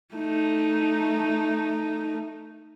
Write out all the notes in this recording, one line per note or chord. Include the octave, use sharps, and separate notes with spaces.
A3 D#4